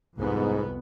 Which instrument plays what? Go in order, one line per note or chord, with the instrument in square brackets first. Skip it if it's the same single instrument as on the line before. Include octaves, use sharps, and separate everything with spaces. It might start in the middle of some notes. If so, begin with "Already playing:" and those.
[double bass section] C2 F2 B3 [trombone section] G#2